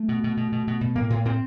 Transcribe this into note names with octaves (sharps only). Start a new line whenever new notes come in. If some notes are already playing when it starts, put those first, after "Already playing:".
Already playing: A3
B2
B2
B2
B2
B2
B2
A2 A#3
A2
A2 C4